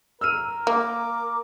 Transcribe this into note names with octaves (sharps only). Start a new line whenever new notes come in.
A#4 E6 F6 D#7
A#3 D6